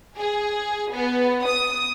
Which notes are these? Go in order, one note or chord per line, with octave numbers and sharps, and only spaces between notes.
G#4
B3
D#6